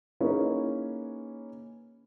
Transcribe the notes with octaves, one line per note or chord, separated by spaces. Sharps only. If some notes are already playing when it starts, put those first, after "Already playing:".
A#3 C#4 D#4 E4 G#4 B4